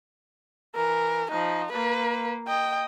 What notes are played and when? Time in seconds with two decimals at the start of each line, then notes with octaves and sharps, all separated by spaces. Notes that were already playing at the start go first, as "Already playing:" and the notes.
0.75 E3 A#4
1.31 F3 D#4
1.73 A#3 B4
2.48 D#5 G5